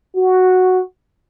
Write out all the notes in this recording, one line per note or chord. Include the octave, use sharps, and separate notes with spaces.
F#4